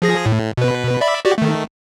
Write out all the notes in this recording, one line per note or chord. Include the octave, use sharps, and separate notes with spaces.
F3 G#4 A#6
A2
B2 B4
D5 E5 B5
F#4 G4 D5
D#3 A3